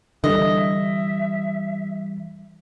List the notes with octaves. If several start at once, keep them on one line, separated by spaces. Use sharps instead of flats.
D3 E3 G3 D#5 E5